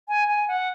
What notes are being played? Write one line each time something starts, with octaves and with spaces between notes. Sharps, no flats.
G#5
G#5
F#5